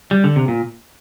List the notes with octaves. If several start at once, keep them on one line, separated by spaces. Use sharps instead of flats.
G3
D3
C3
A#2